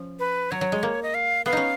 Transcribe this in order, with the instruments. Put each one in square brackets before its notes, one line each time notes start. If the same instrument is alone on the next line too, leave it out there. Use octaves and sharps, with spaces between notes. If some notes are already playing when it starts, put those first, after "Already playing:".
Already playing: [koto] F3 C#4
[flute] B4
[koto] F#3 [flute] C#5
[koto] F#3
G#3
A#3
[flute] D#5
F5
[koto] B3 [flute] F5
[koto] C#4 D#4